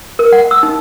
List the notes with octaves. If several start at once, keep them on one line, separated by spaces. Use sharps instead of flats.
A#4
F#5
E6
D#4